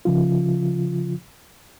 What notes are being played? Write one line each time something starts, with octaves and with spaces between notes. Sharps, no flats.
C#3 F3 F4